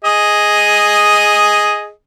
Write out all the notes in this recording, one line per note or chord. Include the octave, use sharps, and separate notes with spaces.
G#4 D#5